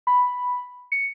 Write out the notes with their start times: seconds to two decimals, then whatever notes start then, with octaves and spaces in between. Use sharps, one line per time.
0.07 B5
0.92 C#7